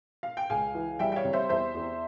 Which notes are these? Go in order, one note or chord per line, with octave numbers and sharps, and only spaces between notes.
F5
G5
C#2 F5 G#5
E3
G3 E5 G5
G5
C#5 F5
C3
C5 E5
E2 C5 E5
E2